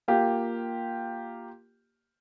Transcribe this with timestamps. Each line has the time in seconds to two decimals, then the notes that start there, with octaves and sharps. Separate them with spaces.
0.08 A#3 F4 G4